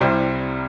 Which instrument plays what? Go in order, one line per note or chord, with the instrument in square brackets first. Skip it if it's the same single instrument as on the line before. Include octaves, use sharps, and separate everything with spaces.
[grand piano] C2 C3 G3 E4 C5